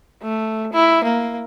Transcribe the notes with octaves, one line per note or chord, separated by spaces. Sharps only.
A3
E4
A#3